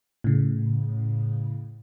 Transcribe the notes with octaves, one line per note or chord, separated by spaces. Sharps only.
A2 C#3